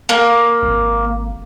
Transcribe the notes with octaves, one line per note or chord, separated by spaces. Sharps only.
A#3
G#1